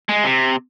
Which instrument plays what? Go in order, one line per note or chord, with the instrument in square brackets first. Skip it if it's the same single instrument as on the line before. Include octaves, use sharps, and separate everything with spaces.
[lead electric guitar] G#3
C3